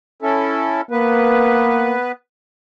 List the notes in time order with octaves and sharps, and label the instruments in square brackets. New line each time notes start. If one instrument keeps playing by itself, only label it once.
[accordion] C#4 E4 A4
[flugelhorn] A#3 [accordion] B3 B4